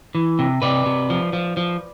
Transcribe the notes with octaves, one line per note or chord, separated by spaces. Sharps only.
E3
C3
C3 B4 D5
C3
F3
F3
F3